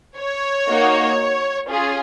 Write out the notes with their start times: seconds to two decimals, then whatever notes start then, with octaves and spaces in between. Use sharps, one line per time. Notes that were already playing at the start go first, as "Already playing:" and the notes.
0.18 C#5
0.68 A#3 D#4 F#4
1.69 C#4 F4 G#4